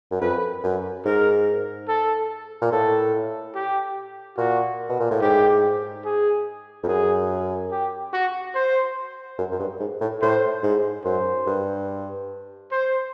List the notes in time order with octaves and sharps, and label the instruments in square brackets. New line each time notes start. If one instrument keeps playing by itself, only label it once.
[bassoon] F#2
[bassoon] F2 [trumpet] B4
[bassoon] F#2
[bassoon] G#2 [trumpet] A#4
[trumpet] A4
[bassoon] A#2
[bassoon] A2 [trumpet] A4
[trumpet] G4
[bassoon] A#2 [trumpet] F#4
[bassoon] B2
A#2
A2
[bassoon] G#2 [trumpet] G4
[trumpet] G#4
[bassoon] F2
[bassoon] F#2 [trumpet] G#4
[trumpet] G4
F#4
C5
[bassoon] F#2
F#2
G2
G#2
A2
[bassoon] A2 [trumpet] C5
[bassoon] G#2
[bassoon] F#2 [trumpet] C5
[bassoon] G2
[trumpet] C5